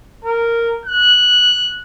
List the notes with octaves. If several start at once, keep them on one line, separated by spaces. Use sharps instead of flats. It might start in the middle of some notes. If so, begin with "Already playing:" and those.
A#4
F#6